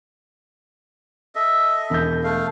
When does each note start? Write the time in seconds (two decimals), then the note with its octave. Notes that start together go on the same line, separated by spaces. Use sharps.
1.35 A4 D#5 E5
1.90 E1 G6
2.24 A3 F5